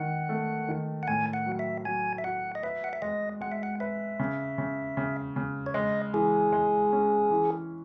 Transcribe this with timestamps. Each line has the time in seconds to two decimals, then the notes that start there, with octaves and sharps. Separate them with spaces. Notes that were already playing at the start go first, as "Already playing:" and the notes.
Already playing: D#3 F#5
0.29 A3
0.68 D#3
1.03 F#5
1.08 A2 G#5
1.33 F#5
1.46 F#3
1.59 E5
1.85 F#3 G#5
2.18 E5
2.24 F#4 F#5
2.55 D#5
2.63 B4 E5
2.84 F#5
2.93 E5
3.02 G#3 D#5
3.41 G#3 F#5
3.52 E5
3.63 F#5
3.80 B4 E5
4.19 C#3
4.58 C#3
4.97 C#3
5.36 C#3
5.66 C#5
5.74 G#3 D#5
6.13 E3 G#4
6.52 G#3
6.92 C#4
7.30 E3